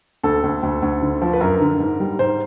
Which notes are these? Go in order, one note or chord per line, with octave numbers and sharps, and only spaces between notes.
D2 A4
D2
D2
D2
D3
F3
B4
F#2 A#4
D3
G#2
G3
G#2 C5